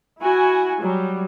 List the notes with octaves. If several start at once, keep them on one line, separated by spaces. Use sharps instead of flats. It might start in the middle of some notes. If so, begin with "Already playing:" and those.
E4 F#4 G#5
F#3 G3